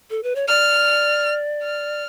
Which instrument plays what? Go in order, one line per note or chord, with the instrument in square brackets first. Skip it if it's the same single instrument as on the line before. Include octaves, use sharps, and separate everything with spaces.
[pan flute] A4
B4
C#5
[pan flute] D5 [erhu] F6
[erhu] F6